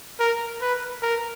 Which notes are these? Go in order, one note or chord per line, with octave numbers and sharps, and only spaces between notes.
A#4
B4
A#4